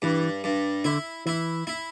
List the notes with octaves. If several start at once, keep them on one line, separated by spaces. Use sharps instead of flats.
G2 E3
G2
D3 E4
E3 E4
E4